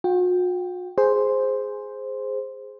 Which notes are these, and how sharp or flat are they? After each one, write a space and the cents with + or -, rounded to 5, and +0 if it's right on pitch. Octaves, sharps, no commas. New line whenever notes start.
F#4 -45 G5 +0
G#4 +0 C5 +0